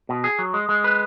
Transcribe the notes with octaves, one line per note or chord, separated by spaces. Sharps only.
B2
G#4
F#3
G#3
G#3
B4